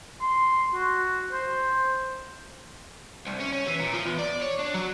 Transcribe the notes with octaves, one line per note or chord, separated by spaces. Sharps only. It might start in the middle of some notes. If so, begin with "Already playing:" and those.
C6
F#4
C5
C2
C#4
C#4
E3
A#2
F3
E2
D5
C#5
D4
F#3